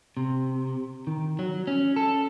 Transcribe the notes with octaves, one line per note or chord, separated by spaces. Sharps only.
C3
D#3
F#3
C#4
A4